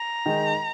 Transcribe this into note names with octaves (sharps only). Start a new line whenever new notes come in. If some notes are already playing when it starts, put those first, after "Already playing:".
Already playing: A#5
D#3 G#3 D#4